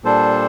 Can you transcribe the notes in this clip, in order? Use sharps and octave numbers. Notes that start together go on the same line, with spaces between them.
A#2 G3 D4 A4 C5